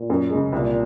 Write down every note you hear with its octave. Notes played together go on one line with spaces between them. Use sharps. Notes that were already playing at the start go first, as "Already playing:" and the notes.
Already playing: A#2
F#2
C#3 G#3
C2 A#2